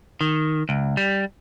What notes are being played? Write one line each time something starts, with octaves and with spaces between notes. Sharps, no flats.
D#3
C#2
G3